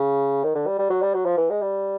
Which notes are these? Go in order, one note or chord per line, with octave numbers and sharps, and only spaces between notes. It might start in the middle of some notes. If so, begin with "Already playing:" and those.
Already playing: C#3
D#3
D3
G3
G3
F#3
G3
F#3
F3
E3
G#3
G3